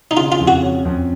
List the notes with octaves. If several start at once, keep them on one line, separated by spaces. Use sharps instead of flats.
D#4
C#3 F4
F4
F2
F#4
C#4
F2